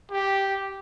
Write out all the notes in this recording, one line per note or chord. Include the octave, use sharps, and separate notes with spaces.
G4